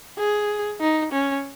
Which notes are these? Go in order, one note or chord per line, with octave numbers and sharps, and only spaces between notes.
G#4
D#4
C#4